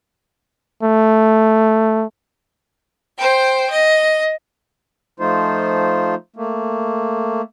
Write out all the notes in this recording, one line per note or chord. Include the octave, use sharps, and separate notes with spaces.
A3
C5 G5
D#5
F3 A3 D#4 F4 C5
A3 A#3